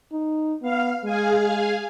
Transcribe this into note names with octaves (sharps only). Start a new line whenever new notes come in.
D#4
B3 F5
G#3 G#4 F5 G#5